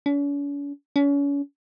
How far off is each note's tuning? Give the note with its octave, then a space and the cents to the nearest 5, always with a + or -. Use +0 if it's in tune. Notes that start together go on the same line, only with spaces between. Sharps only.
C#4 +45
C#4 +35